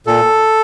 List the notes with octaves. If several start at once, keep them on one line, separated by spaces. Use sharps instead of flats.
A#2 A4